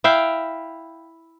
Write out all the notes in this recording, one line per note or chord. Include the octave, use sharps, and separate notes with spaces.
E4 E5 F5 G5